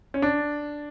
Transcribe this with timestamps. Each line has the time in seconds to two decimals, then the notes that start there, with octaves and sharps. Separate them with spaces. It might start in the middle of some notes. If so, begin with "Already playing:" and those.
0.14 C#4
0.22 D4